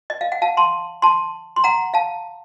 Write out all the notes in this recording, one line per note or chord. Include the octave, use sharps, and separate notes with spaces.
D#5
F5
F#5
F5 A5
A5 C6
A5 C6
C6
F#5 A#5
F5 A5